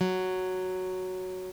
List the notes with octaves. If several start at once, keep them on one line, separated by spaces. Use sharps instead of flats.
F#3